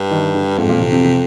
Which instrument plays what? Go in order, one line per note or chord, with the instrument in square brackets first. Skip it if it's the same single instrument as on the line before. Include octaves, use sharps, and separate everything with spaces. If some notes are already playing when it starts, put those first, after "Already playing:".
Already playing: [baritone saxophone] G2
[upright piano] D#3
D3
[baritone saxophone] F2 [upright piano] G#2
[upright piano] A#2
C3
C3
C3